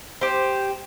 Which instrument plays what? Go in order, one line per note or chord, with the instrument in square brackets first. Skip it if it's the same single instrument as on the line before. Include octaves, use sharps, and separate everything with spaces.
[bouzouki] G4 C5